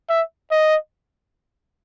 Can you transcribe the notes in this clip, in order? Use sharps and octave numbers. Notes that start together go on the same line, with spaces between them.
E5
D#5